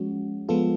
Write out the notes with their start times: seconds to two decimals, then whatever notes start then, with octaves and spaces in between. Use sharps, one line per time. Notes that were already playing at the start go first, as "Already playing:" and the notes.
Already playing: F3 G#3 C#4 F#4
0.49 F3 G#3 B3 F4 A4